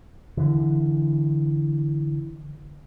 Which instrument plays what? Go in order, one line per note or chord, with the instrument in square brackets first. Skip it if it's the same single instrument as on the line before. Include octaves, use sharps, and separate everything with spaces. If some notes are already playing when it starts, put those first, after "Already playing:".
[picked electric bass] D3 E3